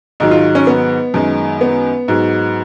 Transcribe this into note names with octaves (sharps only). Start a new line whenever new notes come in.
G#2 D#3 F#3 D#4
F4
C#4
B3
F#2 D#3 G#3
B3
G#2 F#3